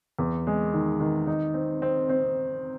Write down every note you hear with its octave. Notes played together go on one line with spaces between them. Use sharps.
E2
G#3
D#3
D#3
D#4
C4
C4
C4